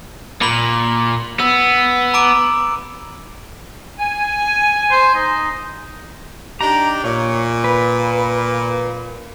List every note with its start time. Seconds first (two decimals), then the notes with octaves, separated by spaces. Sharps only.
0.42 A#2 B5 F#7
1.39 B3 E6
2.14 A#5 D6 D7
3.98 G#5
4.91 C5
5.15 D#4
6.61 D4 D#4 G4 A#5
7.04 A#2 C#5
7.64 B4